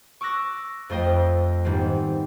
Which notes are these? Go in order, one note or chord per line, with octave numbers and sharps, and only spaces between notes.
C#6 D6 E6 F#6 A#6
F2 A3 C5 D#5 G5
G#2 D#3 G3 B3 C4